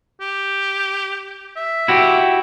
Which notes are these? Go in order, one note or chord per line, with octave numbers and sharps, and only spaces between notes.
G4
E5
E4 F#4 G4